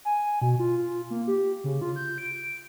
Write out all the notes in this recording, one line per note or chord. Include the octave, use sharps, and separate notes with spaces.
G#5
B2
F4
F4
A#3
G4
C#3
F4
G6
D7